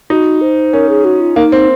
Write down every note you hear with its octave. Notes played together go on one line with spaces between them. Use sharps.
D#4 F#4
C5
C#4 A#4
G#4
F#4
F4
A#3 D#4
C4